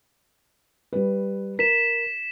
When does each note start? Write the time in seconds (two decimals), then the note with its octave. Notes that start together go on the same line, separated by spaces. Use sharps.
0.93 G3 B4
1.59 A#4 B6 E7